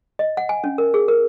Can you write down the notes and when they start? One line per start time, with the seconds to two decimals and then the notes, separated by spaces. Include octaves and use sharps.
0.19 D#5
0.37 F#5
0.49 G#5
0.64 C#4
0.78 A#4
0.94 G#4
1.08 A#4